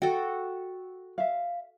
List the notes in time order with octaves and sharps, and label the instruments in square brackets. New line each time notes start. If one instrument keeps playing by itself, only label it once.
[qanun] F#4 A4 [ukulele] G5
[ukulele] E5 F5